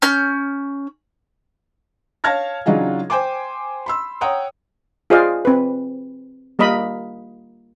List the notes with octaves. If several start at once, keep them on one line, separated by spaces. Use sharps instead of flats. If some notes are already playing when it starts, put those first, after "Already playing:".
C#4 F6 G6
C#5 F5 A5 F6 G#6 A#6
C#3 F#3 D4 D#4 F4 G#4
C5 G5 G#5 C6 D6
B5 C6 E6
C#5 F#5 G5 A#5 D#6
F4 G#4 C5 D5 D#5 F5
C4 B4
G3 A#3 A#4 D#5 B5